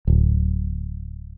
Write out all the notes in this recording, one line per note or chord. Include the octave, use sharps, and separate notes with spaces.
D1